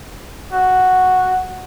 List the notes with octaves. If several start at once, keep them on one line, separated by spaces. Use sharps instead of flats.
F#4